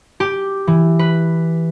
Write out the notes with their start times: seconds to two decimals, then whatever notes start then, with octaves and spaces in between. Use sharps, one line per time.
0.20 G4
0.67 E3
0.99 B4